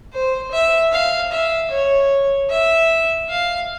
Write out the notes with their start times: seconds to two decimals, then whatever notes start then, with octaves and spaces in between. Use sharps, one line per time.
0.13 C5
0.51 E5
0.92 F5
1.31 E5
1.70 C#5
2.50 E5
3.29 F5